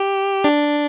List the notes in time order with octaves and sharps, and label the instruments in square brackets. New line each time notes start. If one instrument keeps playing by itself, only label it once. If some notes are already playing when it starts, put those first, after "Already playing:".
Already playing: [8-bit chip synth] G4
D4